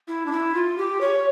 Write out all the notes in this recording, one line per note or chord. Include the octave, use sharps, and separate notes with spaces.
E4
D4
E4
F4
G4
C#5